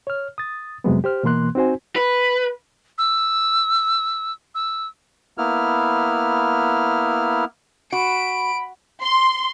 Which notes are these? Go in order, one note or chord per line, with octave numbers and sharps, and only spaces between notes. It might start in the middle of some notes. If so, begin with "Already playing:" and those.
C#5 F6
D#6 A6
F2 C3 F#3 G#3 B3
G4 C5 F6
B2 E3 A#3 C6 F#6
C4 D#4 F#4 C5 G#5
B4
E6
E6
A#3 B3 E4 F6
F#4 B5 D7
C6